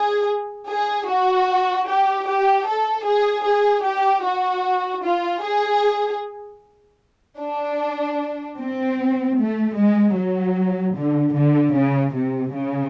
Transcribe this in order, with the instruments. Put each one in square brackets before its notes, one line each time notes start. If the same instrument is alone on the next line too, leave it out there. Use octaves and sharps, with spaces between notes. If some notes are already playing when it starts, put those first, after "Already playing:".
Already playing: [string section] G#4
G#4
F#4
G4
G4
A4
G#4
G#4
G4
F#4
F4
G#4
D4
C4
A3
G#3
F#3
D3
D3
C#3
C3
C#3